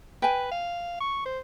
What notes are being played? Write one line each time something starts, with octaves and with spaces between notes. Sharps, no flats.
B4 G5 G#5
F5
C#6
C5